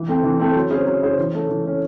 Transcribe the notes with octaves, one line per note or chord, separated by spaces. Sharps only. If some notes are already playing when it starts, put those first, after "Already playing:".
Already playing: E3
A3 C4
E3
A3 C4
F#3
C#4 E4 G#4 C5
F#3
C#4 E4 G#4 C5
E3
A3 C#4
E3
A3 C#4